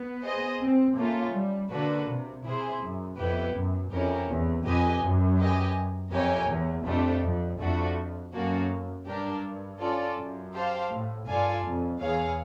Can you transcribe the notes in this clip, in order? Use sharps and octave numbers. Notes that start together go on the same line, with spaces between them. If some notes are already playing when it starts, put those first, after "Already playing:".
Already playing: B3
G#4 C5 D#5
C4
A3 A#3 C#4 F4
G3
D3 A#3 D4 F#4 B4
C3
C3 E4 G#4 C5
F#2
F2 B3 E4 G4 B4
F#2
F2 C#4 E4 G4 A#4 C#5
E2
F2 G4 B4 D#5 G#5
F#2
G4 B4 D#5 G#5
F2 G4 A#4 C#5 E5 G#5
E2
F2 A3 D4 G4
F2
F2 A3 D4 F#4
F#2 A#3 C#4 F#4 A4
G2 D4 G4 A#4
C#4 F4 A4 D5
F#2
G4 C5 F5 A5
A2
G2 F4 A4 D5 F5 G#5
F2
E2 G#4 C#5 F5